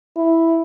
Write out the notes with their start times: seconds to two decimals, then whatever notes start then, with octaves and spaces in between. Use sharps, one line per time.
0.17 E4